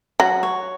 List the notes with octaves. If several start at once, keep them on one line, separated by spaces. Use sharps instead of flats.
F#3 F#5
C#5